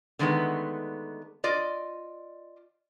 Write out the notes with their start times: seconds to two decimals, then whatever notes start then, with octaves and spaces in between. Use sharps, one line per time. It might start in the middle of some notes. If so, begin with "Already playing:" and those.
0.19 D3 D#3 G#3 A3 B3
1.44 F4 D5 D#5